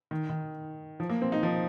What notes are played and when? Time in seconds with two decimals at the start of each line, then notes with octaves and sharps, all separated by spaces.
0.11 D#3
0.29 D#3
1.00 F3
1.09 A#3
1.22 C4
1.32 D#4
1.43 F3